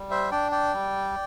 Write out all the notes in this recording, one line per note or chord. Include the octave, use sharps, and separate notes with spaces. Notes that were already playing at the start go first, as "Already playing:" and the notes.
Already playing: G3
C5 E5
D4 D5 G5
D5 G5
G3